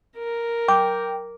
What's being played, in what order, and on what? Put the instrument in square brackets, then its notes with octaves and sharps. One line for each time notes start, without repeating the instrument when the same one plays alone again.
[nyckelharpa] A#4
[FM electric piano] G5 [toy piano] D6